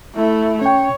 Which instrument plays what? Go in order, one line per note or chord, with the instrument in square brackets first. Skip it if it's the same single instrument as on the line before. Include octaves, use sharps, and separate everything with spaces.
[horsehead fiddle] A3 E4
[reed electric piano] C#4 G5 [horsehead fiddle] C#5